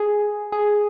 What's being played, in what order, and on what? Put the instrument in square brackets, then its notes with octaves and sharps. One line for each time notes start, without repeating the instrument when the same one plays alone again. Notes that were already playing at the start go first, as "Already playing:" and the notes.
Already playing: [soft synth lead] G#4
G#4